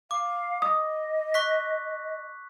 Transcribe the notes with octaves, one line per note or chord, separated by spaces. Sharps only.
F5 D6
D#5 D#6
C#6 F#6 B6